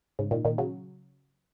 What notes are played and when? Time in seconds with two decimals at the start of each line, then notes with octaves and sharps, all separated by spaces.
0.19 G#2 C#3
0.31 A#2 D#3
0.45 A#2 D#3
0.58 C#3 F#3